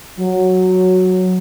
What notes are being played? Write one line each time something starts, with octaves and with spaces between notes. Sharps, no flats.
F#3